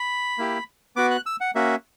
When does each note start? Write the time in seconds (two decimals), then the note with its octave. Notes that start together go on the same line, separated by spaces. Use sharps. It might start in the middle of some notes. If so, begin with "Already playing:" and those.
Already playing: B5
0.38 A#3 E4 G4
0.96 B3 F#4 D6
1.11 F#6
1.26 E6
1.41 F#5
1.55 A#3 C#4 F#4 E5